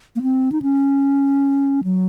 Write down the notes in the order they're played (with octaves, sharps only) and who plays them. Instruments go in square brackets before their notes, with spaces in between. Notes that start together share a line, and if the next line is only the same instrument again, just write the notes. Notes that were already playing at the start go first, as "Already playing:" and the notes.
[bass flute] A#3
C4
D#4
C#4
F#3